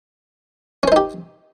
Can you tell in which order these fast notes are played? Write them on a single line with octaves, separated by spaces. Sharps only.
C#4 C5 D#4 G4